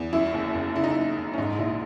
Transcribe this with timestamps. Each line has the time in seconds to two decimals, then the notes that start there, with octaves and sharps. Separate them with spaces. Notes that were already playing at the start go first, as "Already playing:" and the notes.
Already playing: E2
0.13 F#2 E4
0.33 F#1
0.55 F#1
0.75 C#3 E4
0.84 D#4
0.91 E4
0.96 F#2
1.17 F#1
1.33 C#4
1.38 G#2 D#4
1.58 A#1 E4